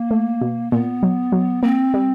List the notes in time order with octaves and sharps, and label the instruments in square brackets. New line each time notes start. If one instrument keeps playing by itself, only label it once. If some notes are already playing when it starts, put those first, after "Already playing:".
Already playing: [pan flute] A#3
[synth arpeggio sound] A3
B2
[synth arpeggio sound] A#2 [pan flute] B3
[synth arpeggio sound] F#3
F#3
[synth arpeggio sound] A#3 [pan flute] C4
[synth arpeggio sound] G3